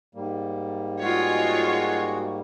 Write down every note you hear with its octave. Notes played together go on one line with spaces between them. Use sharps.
G#2 G3 A#3
G#3 F4 F#4 C#5